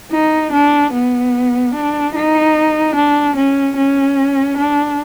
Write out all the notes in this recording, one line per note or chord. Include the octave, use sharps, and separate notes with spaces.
D#4
D4
B3
D4
D#4
D4
C#4
C#4
D4